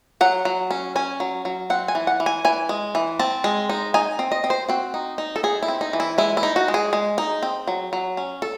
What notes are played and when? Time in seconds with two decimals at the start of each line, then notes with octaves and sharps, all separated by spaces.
0.21 F#3 F#5
0.45 F#3
0.71 C#4
0.96 C#4 G#5
1.20 F#3
1.45 F#3
1.70 C4 F#5
1.88 G#5
1.95 E3
2.07 F#5
2.20 E3
2.26 G#5
2.45 E3 G#5
2.69 G#3
2.95 E3
3.19 C4 A5
3.44 G#3
3.70 D#4
3.94 D#4 G#5
4.19 C4
4.32 D#5
4.44 C4
4.50 C5
4.69 C4 F#4
4.94 D#4
5.18 D#4
5.36 A4
5.43 D#4 G#4
5.63 E4
5.68 C4
5.81 D#4
5.93 E3
6.00 E4
6.18 G#3 E4
6.37 E4
6.43 D#4
6.56 F#4
6.68 G#3
6.74 G#4
6.93 G#3
7.18 D#4
7.43 C4
7.68 F#3
7.93 F#3
8.17 C#4
8.42 A4